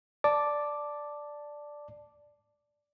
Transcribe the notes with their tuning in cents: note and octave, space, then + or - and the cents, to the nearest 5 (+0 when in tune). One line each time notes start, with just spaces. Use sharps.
D5 +0 A5 +0 D6 +0